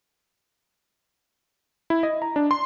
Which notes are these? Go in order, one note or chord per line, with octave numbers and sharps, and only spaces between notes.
E4
D#5
A#5
D4
C6